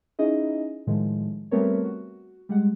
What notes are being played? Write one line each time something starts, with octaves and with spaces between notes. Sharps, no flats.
C#4 D#4 E4 G#4 D#5
A2 D#3 F3 G#3
G3 A3 B3 C4 A#4 C#5
F#4
G3 G#3 F#5